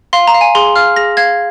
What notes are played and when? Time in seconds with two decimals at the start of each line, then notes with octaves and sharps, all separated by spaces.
0.13 F5 C6
0.27 A#5
0.34 F5
0.41 G#5
0.55 G#4 C6
0.76 F5 F6
0.96 G#4 A#6
1.17 F5 G#6